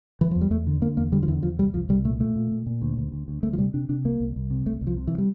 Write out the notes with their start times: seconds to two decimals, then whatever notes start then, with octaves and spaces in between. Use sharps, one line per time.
0.21 E3
0.31 E2 F3
0.41 G3
0.51 E2 A3
0.67 D3
0.82 D3 A#3
0.97 E2 A#3
1.12 D3 G3
1.23 F3
1.28 E2 E3
1.43 E2 F3
1.58 C2 G3
1.74 C2 F3
1.89 C2 G3
2.05 A#2 A3
2.20 A#2 A3
2.36 A#2
2.51 A#2
2.66 A#2
2.82 D2
2.98 D2
3.12 D2
3.28 D2
3.43 D2 A3
3.53 F3
3.58 C3 G3
3.74 C3 D4
3.89 C3 D4
4.05 C2 A#3
4.20 C2
4.36 C2
4.50 C3
4.66 C2 A3
4.81 C2
4.87 F3
4.97 C3
5.07 E3
5.18 G3